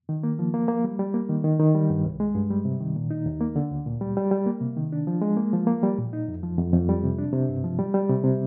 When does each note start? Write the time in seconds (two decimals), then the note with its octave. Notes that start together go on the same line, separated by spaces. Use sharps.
0.09 D#3
0.23 A#3
0.39 F3
0.54 A#3
0.68 A#3
0.84 G3
0.99 G3
1.14 A#3
1.29 D#3
1.44 D#3
1.60 D#3
1.75 G3
1.90 G2
2.05 C2
2.20 G#3
2.35 G2
2.50 G3
2.65 C3
2.80 D#3
2.96 A#2
3.11 D#4
3.26 D#2
3.41 A#3
3.56 D3
3.71 D2
3.86 A#2
4.01 G3
4.17 G3
4.31 G3
4.46 A#3
4.61 C3
4.77 D#3
4.93 D4
5.07 F3
5.22 G#3
5.37 A#3
5.53 F3
5.67 A#3
5.83 G3
5.98 A#2
6.13 D#4
6.28 F2
6.43 F3
6.58 F2
6.73 F2
6.89 G3
7.04 C3
7.18 D4
7.33 C3
7.49 G2
7.64 F3
7.79 G3
7.94 G3
8.09 C3
8.24 C3